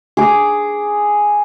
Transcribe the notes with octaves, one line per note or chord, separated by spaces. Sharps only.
G#4 D6